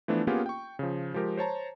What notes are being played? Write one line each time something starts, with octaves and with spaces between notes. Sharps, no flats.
E3 F3 A3 B3 D4
A#3 B3 C#4 F4 G4 G#4
G5 C#6
C#3 F3
F3 G#3 G4 A#4
C5 C#5 A5 A#5